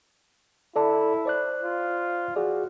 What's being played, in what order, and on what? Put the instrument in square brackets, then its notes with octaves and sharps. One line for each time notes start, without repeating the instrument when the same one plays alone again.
[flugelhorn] E4 [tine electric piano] A4 D5 A5
[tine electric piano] C5 D5 F#6
[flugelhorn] F4
[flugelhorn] F#4 [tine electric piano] G#4 D5